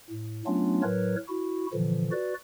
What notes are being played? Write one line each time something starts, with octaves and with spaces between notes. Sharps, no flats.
A2
F#3 A3 B3 C#4 D4 F4
A2 F#3 A#4 B4 C#5
E4 F#4
A#2 D3 E3 F3
F#4 B4 D5